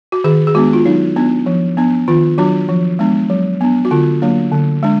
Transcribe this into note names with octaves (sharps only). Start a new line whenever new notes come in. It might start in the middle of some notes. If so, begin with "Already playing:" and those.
F#4
D#3 G#4
G#4
G#3 B3 D4 F#4
F4
F#3 D#4
B3 D4
F3
B3 D4
D#3 F4
F#3 D4 F#4
F3
G#3 B3 D4
F#3
B3 D4
F#4
D3 F4
F#3 A#3 D4
D3
G#3 D4